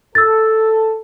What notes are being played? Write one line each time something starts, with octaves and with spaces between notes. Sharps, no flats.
A4 E6 A6